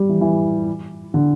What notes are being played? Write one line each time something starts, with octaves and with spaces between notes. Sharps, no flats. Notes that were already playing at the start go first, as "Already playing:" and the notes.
Already playing: G3
E3
E3
D3